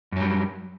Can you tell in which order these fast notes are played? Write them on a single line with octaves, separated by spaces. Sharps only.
F#2 F#3 G3